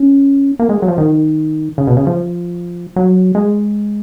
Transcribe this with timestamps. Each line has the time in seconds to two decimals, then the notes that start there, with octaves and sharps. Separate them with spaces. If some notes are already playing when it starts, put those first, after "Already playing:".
Already playing: C#4
0.59 A#3
0.69 G#3
0.82 F#3
0.88 F3
0.98 D#3
1.78 C#3
1.87 B2
1.97 C#3
2.07 F3
2.96 F#3
3.35 G#3